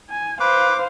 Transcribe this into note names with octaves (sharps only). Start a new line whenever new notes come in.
G#5
B4 C5 F5 D6